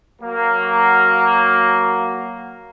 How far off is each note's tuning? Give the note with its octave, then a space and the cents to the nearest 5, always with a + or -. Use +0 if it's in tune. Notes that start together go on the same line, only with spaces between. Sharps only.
F#3 +0 A#3 +0 F#4 +5